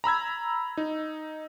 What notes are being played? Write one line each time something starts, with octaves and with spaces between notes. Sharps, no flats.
A#5 B5 E6 G#6
D#4